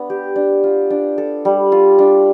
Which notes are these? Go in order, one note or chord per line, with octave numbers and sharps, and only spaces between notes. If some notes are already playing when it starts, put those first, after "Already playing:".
Already playing: B3 D4
G4
D4
F4
D4
A4
G3
F4
D4